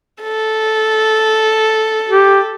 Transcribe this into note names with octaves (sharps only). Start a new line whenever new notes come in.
A4
G4